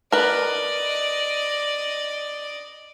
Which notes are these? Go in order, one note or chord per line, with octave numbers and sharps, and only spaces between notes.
A#4 B4 D5 D#5